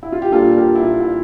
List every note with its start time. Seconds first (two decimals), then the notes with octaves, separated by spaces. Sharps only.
0.03 E4
0.12 F4
0.22 G4
0.32 A#2 G3 A#3 D4 F4 A4
0.57 G4 A#4
0.75 E4
0.83 F4
1.00 E4